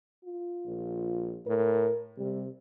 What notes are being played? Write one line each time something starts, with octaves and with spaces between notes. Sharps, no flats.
F4
A#1
A2 A#4
C3 G3